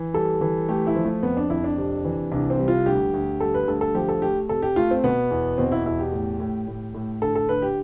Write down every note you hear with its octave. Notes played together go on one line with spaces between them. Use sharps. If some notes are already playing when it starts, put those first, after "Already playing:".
Already playing: E3
G3 A4
E3
A3 G4
E4
F3
A3
F2 B3
D4
F2 E4
D4
C3
E3
C2 D4
C4
G3
F4
D2 G4
D2
G3 A4
B4
D2 A4
A4
F3 G4
A4
A3 G4
C3 A4
G4
A3 F4
C4
B2 B3
E2
B2 C4
E4
E2 E4
G4
A2
A2
A2
A2
D3 A4
A4
D3 B4
G4